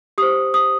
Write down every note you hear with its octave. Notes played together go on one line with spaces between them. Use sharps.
G4 C5 D#6
D#6